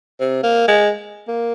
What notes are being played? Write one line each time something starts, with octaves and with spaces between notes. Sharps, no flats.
C3
A#3
G#3
A#3